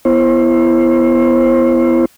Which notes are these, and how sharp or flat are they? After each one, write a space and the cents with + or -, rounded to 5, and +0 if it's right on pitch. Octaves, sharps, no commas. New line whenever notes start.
B3 +0 E4 +20 C5 +30